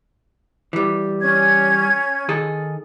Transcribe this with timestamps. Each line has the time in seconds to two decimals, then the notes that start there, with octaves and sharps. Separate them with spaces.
0.73 E3 G3
1.21 C#4 G#6
2.29 D#3 G#4 A4